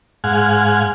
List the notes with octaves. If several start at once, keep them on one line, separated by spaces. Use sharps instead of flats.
G#2 F5 F#5 G#5